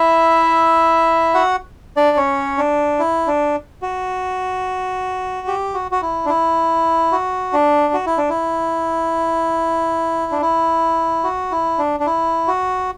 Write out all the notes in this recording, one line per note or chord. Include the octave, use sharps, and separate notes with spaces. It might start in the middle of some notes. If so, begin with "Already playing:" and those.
Already playing: E4 E5
F#4 F#5
D4 D5
C#4 C#5
D4
E4
D4
F#4
G4
F#4
F#4
E4
D4
E4
F#4
D4
F#4
E4
D4
E4
D4
E4
F#4
E4
D4
D4
E4
F#4